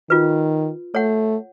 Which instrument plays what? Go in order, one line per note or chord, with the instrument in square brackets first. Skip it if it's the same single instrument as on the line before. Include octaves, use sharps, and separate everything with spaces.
[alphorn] D#3 [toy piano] F4 B4
[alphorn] A3 [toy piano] C#5 F#5